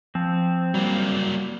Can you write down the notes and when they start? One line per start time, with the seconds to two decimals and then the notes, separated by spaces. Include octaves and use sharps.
0.15 F3 C4
0.74 F#3 G3 A#3